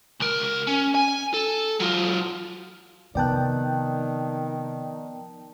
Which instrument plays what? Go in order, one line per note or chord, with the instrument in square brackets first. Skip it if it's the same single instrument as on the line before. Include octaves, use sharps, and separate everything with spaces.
[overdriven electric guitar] C#2 A#4
C#4
G#5
A4
F#3 F4
[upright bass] C3 [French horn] D#3 [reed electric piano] F3 B3 F#6 [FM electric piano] D5 G5 A5